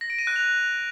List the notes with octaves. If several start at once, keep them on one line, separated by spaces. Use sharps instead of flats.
A#6
D7
D#7
F#6
F7